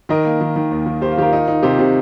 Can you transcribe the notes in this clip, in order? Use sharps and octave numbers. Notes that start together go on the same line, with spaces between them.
D#3 A#4 D#5
A#3
D#3
D#3
D#2
D#3
A#3 G4 C5
F4
D#3 F4 G4 A#4
D#4
D#4
C3 G4 C5
C3